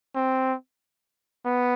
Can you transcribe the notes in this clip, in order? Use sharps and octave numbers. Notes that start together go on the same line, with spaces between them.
C4
B3